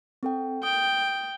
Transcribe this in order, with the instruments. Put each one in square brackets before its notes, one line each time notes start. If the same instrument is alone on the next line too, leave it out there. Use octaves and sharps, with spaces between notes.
[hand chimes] C4 A4 G5
[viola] G5 [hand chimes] D#6